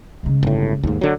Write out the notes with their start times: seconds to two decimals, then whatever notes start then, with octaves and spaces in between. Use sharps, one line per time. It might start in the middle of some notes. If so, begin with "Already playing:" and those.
0.23 C#3 G#3
0.43 G1 A2
0.83 D#2 G#2 A#3
1.01 D3 F#3